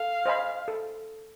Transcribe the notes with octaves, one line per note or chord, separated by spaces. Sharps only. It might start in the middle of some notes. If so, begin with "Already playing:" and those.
Already playing: A4 F5
C5 D#5 G#5 B5
A4